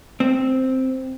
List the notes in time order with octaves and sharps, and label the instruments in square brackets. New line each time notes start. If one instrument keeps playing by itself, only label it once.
[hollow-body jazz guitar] C4